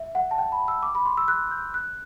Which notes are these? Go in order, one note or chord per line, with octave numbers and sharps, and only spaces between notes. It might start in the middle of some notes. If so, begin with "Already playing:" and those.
Already playing: E5
F#5
A5
G5
B5
E6
D6
B5
C6
E6
F#6
G6
F#6